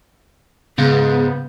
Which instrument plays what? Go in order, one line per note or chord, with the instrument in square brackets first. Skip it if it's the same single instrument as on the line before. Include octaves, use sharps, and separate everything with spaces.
[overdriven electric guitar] G#2 [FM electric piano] C#3 F5 G6 [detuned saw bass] B3 [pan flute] G#4